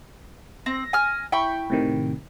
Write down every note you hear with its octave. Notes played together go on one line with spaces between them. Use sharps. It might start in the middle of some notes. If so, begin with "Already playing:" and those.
C4 A#6
G#5 F6
E4 G5 B5 C#6
A2 C3 D#3